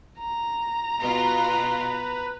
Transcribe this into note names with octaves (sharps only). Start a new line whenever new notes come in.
A#5
B2 F4 B4